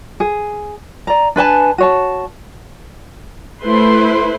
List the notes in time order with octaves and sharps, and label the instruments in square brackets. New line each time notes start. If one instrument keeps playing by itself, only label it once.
[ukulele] G#4
D5 A#5
D4 B4 G#5 A5
F#4 C#5 A5
[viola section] A3 E4 B4 C5 C6